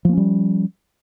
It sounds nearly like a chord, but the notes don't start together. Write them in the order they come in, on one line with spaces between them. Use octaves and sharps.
F3 A#3 C#4 G3